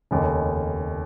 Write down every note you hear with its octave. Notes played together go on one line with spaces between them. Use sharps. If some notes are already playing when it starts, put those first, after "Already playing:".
F1 D#2 C#3